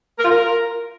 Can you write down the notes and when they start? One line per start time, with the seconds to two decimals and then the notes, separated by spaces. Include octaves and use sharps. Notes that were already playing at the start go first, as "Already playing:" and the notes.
0.18 A#4
0.24 F4
0.30 A#4